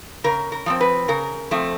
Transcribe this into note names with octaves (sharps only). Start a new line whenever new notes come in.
C#3 A#4
A#4
F3 A3 C4
B4
C#3 A#4
F3 A3 C4